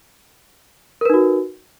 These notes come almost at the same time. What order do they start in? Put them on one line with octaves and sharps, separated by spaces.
A#4 B4 D#4 F#4